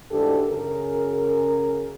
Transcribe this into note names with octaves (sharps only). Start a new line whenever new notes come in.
D2 G#2 E3 D4 G4 A4
F#2 C#3 G#4 A#4